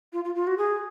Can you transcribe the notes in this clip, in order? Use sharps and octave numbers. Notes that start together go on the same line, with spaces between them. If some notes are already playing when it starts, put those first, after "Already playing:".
F4
F4
F4
F#4
G#4